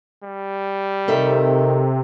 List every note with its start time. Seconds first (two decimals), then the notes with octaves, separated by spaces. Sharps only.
0.24 G3
1.08 C3 D#3 A4 A#4 E5